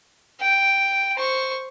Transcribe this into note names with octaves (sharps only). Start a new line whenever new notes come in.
G5
C5 C#6